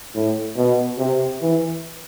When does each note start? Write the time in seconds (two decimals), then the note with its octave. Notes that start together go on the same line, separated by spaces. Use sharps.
0.15 A2
0.57 B2
0.99 C3
1.42 E3